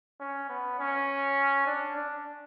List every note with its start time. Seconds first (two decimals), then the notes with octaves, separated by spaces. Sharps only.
0.20 C#4
0.49 B3
0.79 C#4
1.66 D4
1.96 D4